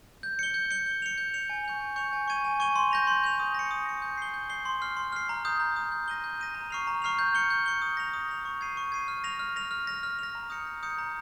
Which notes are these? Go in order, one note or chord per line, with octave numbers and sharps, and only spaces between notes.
G6
C#7 G7
G6
C#7 G7
G6
C#7 F7
G6
C#7 F7
G#5
C#6 G6 C#7 F7
G#5
C#6 G6 C#7 F7
G#5
C#6 G#6 D#7 G7
G#5
C#6 G#6 D#7 G7
C6
G6 A#6 F7
C6
G6 A#6 F7
D#6
A#6 C#7
D#6
A#6 C#7
G6
C7 G7
G6
C7 G7
C6
F6 C7
C6
F6 C7
A#5
D#6 G6
A#5
D#6 G6
G6
A#6 D#7 G7
G6
A#6 D#7 G7
A#5
C#6 F6 C7 F7
A#5
C#6 F6 C7 F7
G6
C#7 G7
G6
C#7 G7
D#6
A#6 F7
D#6
A#6 F7
C#6
G#6 C7 D#7
C#6
G#6 C7 D#7
F6
A#6 F7
F6
A#6 F7
F6
A#6 F7
F6
A#6 F7
A#5
D#6 G6 C#7
A#5
D#6 G6 C#7
A#5